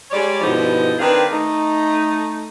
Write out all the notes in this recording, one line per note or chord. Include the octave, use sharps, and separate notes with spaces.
G3 G#3 C#5 D5
G2 B2 D3 F3 D#4 E4
D#3 C4 D4 G#4 B4 F5
A3 D#4